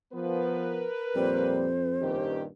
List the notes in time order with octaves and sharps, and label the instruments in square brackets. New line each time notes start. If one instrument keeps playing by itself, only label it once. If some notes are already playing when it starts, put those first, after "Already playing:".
[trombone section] F3 B3 [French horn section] A#4 B4
[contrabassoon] F2 [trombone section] A#2 G3 [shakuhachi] C5
[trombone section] G2 A#2 D#3 [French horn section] C#4 G4